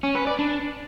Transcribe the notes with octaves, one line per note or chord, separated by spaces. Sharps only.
C#4
B4
D5
D4